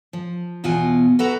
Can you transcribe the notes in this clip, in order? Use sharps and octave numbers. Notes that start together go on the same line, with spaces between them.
F3
E2 B2 F4 F#5 G#5
F#4 A4 B4 E5 F#5 A#5